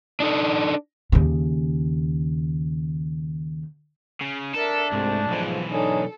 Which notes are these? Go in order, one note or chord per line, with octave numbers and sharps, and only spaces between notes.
D4 D#4 A4
D#2 C#3
C#3
D4 A4 A#4 E5
C2 G#2 C3 A3
B1 G#2 E3 F3
D4 D#4 G#4 A4 C#5